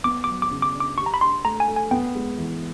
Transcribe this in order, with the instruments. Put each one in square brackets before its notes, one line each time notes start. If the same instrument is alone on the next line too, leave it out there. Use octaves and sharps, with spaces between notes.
[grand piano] B3 [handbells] D6
[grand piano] F#3 [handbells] D6
[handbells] D6
[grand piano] C#3
[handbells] D6
[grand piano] D4
[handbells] D6
[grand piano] G4 [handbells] C#6
[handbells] A#5
B5
[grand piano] D4 [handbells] C6
[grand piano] A3 [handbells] A#5
[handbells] G#5
[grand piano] A3
[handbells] G#5
[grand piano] B3 [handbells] G5
[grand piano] G#3
E3